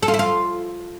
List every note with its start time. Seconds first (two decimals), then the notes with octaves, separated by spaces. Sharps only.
0.03 A4
0.08 F4
0.14 E4
0.19 F4